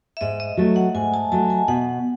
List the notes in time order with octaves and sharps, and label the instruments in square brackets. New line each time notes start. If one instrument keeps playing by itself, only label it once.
[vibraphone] E5
[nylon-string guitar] G#2 [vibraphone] D#5
[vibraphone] D#5
[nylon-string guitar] F#3 A3
[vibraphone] F#5
[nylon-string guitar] G#2 [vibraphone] G#5
[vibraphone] A5
[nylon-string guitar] F#3 A3 [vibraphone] A5
[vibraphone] G#5
[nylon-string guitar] B2 [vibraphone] F#5